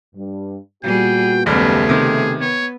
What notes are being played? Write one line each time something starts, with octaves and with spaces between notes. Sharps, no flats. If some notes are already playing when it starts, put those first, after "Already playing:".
G2
A#2 G3 B3 F#4 G#4 G5
F#1 D#2 C#3 G3 A3 B3 G4 G#4
C3 D#3
B3 C#5